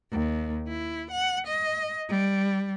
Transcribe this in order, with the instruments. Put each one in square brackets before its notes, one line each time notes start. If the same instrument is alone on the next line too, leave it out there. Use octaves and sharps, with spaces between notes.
[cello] D#2
E4
F#5
D#5
G3